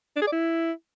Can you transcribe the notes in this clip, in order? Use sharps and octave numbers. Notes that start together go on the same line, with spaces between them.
D4
G#4
D5
E4